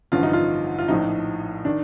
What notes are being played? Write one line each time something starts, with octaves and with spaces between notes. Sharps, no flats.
A1 G2 D3 F3 F4
D#4
F4
F4
A#1 A2 F3 D#4
D#3 D4